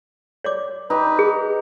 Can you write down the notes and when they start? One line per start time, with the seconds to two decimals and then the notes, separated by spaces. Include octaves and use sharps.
0.44 C#5 D5 D6
0.90 D#4 G4 B4
1.19 G#4